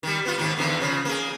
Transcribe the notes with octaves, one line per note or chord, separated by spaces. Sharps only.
D#3 G3
B3 F4
G#2 D#3 A#3
E2 D3 D#3
C#3 F3
A#3 G#4